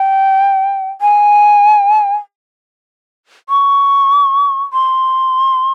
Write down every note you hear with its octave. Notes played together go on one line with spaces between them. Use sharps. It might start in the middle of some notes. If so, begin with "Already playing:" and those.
Already playing: G5
G#5
C#6
C6